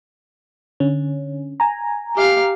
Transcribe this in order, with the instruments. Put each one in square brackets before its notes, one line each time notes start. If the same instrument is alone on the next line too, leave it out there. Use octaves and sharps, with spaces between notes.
[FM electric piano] D3 C#4
G#5 A#5
[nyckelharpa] G4 F5